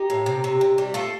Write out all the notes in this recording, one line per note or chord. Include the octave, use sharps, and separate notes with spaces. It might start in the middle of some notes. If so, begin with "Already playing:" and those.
Already playing: D#4 G4
A2
C3
C3
C3
G3
A3 F4 A4